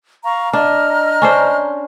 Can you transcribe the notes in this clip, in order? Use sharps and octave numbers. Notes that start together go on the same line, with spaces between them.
F5 A#5 C#6
D4 D#5 A#5 F6
C#4 D4 C5